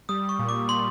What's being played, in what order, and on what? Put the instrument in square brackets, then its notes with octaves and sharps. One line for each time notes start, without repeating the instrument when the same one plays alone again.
[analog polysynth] G3 [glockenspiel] D#6
[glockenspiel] C#6
[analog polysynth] A#2
[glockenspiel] D6
[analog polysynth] A#2 [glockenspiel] C6